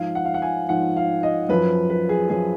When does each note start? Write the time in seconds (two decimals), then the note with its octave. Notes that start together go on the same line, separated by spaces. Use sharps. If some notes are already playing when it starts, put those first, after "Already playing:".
Already playing: G#2 F3 F5
0.15 F#5
0.25 F5
0.34 F#5
0.42 G#5
0.69 G#2 F3 F#5
0.96 F5
1.23 D#5
1.49 F#2 F3 B4
1.90 B4
2.09 G#4
2.29 F#2 F3 G#4